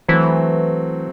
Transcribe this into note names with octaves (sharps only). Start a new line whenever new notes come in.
E3 F#3 A3 C4